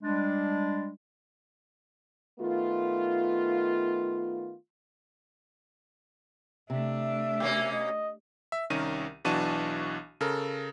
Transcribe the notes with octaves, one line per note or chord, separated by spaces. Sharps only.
G3 G#3 D4
D#3 A3 B3 F4
C3 A3 D4 E5
B2 A#3 C#4
D#5
E5
C2 D#3 C#4 A#4 D#7
B1 E3 D4 F#4 A5 D#7
C#3 A4 A#4